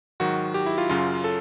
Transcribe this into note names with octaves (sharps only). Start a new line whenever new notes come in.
G#2 D#3 F#3 F#4
G4
E4
F4
F#2 C#3 F#3 F4
A4